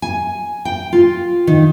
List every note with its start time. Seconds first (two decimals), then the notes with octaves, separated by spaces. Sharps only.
0.02 G#5
0.65 G5
0.93 F4
1.47 D#3